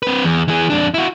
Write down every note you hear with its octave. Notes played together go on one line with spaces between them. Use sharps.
C4 B4
E2
E3 G#4
F2 D4
E4 F#4